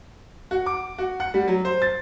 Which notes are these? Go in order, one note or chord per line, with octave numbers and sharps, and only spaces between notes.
F#4
D6
F#4
F#5
G3
F#3
C5
A6